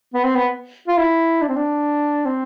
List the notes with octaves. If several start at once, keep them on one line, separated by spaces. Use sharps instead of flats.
B3
C4
B3
F4
E4
D4
C4
D4
C4